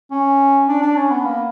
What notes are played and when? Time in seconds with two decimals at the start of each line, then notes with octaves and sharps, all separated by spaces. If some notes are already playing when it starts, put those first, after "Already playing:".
0.11 C#4
0.68 D4
0.82 D4
0.96 C#4
1.10 B3
1.25 A#3